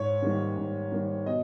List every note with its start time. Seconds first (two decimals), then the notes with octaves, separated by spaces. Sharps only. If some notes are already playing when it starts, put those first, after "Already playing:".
Already playing: G#2 C#5
0.22 D#3 G3 A#3
0.57 G#2
0.92 D#3 G3 A#3
1.26 B2 D#5